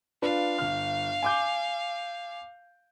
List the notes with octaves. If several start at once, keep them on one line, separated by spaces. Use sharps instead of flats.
D4 F4 B4 F5
G1 F6
G#5 D6 G6